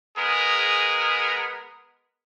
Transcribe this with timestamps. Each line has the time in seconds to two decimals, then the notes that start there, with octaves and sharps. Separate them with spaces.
0.18 G#3 B3 G#4 A#4